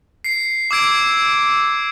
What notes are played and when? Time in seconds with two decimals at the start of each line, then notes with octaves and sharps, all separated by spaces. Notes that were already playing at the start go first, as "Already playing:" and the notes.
0.24 C7 C#7
0.71 D6 E6 G#6 D7